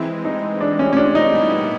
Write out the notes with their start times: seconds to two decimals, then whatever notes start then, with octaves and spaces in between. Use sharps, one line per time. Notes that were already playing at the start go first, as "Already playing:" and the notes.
Already playing: E3 G#3 C4 E4
0.25 D#4
0.61 D4
0.79 C#4
0.93 C#4
0.97 D4
1.15 D#4
1.33 A#2 G3 B3 E4